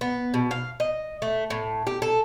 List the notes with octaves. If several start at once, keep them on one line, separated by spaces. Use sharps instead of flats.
B3
B2
F5
D#5
A3
A2
G4
A4